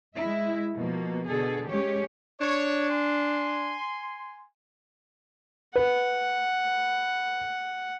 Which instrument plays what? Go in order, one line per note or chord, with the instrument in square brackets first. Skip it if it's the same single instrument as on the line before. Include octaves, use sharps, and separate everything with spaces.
[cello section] G#3 E4 E5
B2 F3 A#3
B2 D3 G#4 A4
G#3 C#4 G4 C#5
[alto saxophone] D4 [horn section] C#5
[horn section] G#5 C6
[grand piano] B4 [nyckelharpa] F#5